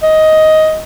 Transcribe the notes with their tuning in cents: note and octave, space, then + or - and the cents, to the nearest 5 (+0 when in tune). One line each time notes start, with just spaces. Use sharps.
D#5 +10